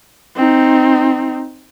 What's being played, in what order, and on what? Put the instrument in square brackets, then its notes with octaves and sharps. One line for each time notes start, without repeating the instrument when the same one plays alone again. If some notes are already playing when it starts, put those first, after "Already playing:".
[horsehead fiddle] C4 D#4